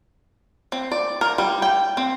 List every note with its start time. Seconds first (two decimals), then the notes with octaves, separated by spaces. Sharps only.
0.72 C4
0.92 D5
1.21 A#4
1.38 G3
1.62 G5
1.97 C4